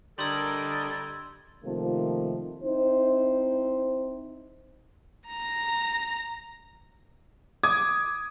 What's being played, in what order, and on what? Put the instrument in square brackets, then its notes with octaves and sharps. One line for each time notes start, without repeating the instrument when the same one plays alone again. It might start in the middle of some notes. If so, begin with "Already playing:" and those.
[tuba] D3 [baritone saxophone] G3 [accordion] A4 A#4 D#5 [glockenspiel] C6 E6 G#6
[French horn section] C3 D#3 F3 A3 A#3
C4 D#4 E4 C5
[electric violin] A#5 A#6
[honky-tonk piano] D6 D#6 G#6